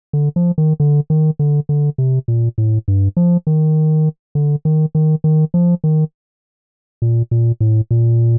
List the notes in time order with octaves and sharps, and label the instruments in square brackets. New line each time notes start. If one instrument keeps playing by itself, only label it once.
[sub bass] D3
F3
D#3
D3
D#3
D3
D3
C3
A#2
A2
G2
F3
D#3
D3
D#3
D#3
D#3
F3
D#3
A#2
A#2
A2
A#2